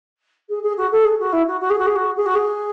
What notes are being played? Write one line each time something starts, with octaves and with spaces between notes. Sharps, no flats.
G#4
G#4
F#4
A4
G#4
F#4
E4
F#4
F#4
G#4
F#4
G#4
F#4
G#4
F#4
G#4